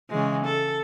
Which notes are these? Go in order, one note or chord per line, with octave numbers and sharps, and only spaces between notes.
C#3 E3 G#3
A4